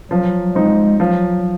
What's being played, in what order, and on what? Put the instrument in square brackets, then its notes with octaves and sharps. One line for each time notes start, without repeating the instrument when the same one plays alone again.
[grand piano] F3 [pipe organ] F#3
[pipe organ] G#3 [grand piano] C4 D#4
[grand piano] F3 [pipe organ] F#3